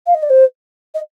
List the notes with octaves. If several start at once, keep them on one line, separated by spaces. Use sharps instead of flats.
F5
D#5
D5
C5
D#5